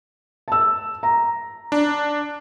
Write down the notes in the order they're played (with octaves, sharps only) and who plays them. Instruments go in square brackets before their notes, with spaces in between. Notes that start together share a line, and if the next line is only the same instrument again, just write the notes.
[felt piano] A5 E6
A#5
[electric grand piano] D4